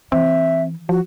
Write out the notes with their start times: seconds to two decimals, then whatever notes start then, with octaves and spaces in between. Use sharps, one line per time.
0.12 E3 C4 E5
0.89 F3 F#4